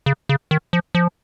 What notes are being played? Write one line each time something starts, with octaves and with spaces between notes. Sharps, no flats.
C#3
C#3
D#3
F3
F3